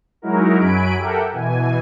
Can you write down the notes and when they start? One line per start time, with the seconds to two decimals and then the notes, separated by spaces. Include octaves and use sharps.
0.22 F#3 G#3 D#4 E4 F#4 A#4
0.58 F#2 F#3 G#5 B5 D7
0.98 G4 A4 A#4 E5 F#5 G5
1.33 B2 E3 G#5